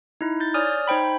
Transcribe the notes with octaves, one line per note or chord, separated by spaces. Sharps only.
D#4 E4
G6 A6
C#5 D5 G#5 D#6 F6
D#4 C5 G5 B5